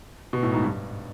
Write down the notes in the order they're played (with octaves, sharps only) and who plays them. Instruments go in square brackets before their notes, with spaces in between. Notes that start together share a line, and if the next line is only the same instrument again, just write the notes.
[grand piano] B2
A2
G#2
G2